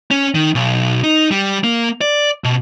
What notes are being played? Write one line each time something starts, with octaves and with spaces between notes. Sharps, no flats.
C#4
D#3
B1
D#4
G3
A#3
D5
B2